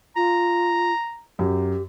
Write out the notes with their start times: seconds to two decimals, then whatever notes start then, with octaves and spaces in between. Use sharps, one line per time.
0.16 F4 A#5
1.39 F#2 G4